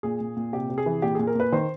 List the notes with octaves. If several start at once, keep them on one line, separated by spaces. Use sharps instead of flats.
A#2 G#4
A#2
A#2
C3 G4
C3
G#4
E3
A#2 G4
A#2 G#4
A#4
A#2 B4
D#3 C5